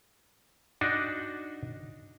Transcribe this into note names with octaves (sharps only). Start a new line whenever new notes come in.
D4 D#4 F#4